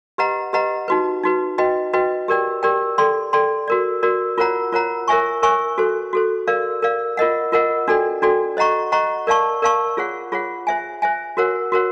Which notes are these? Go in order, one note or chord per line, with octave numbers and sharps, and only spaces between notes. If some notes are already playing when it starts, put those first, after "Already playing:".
G4 B4 D#5 F#5 A#5
G4 B4 D#5 F#5 A#5
D#4 F#4 B4
D#4 F#4 B4
F#4 B4 D#5 G5
F#4 B4 D#5 G5
G4 A#4 D5 G5
G4 A#4 D5 G5
A4 D5 G5 C6
A4 D5 G5 C6
F#4 A#4 D5
F#4 A#4 D5
F4 A#4 C#5 F#5 A#5
F4 A#4 C#5 F#5 A#5
A#4 C#5 E5 G#5 C#6
A#4 C#5 E5 G#5 C#6
F#4 A4 C5
F#4 A4 C5
A#4 D5 F5
A#4 D5 F5
F4 A#4 D#5 F#5
F4 A#4 D#5 F#5
D4 F#4 A4 D5 G5
D4 F#4 A4 D5 G5
C5 D#5 F#5 A#5 C#6
C5 D#5 F#5 A#5 C#6
A#4 D5 F5 A5 C#6
A#4 D5 F5 A5 C#6
F4 G#4 C#5 F#5
F4 G#4 C#5 F#5
C5 E5 G#5
C5 E5 G#5
F#4 A#4 C#5 F#5
F#4 A#4 C#5 F#5